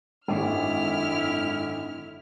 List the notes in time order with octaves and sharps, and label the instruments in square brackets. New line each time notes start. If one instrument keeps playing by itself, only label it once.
[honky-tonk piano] G#1 [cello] F#2 E4 [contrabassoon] D3 [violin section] F6